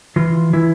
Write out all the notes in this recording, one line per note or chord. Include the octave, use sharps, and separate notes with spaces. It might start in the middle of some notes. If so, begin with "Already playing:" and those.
E3 F4
E3 E4